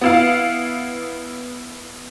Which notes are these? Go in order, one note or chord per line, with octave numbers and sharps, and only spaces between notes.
B3 E4 F5